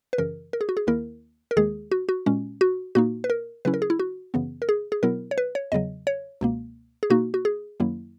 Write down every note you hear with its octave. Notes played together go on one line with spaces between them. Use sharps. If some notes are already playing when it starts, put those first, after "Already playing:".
B4
F#2 C#3 E3 A#4
A#4
G#4
F#4
G#4
D#2 D#3 A#3 E4 A#4
A#4
D#2 D#3 G#3 G#4
F#4
F#4
A#2 G#3 C#4
F#4
A#2 A#3 D#4 F#4
B4
A#4
C#3 F#3 C#4 E4 B4
A#4
G#4
E4
F#4
F#2 C#3 E3 B3
A#4
G#4
G#4
B2 F#3 B3 E4 A#4
C#5
B4
C#5
E2 C#3 F#3 D#5
C#5
C#2 B2 A#3
G#4
B2 A#3 D#4 F#4
F#4
G#4
F#2 D#3 F#3 A#3 E4